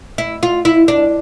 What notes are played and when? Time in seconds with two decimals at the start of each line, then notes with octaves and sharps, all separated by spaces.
0.18 E4
0.43 F4
0.65 E4
0.88 D4